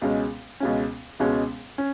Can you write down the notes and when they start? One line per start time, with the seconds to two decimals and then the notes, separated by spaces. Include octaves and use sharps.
0.02 C#2 B2 G#3 C#4
0.60 C#2 B2 G#3 C#4
1.19 C#2 B2 G#3 C#4
1.78 C#4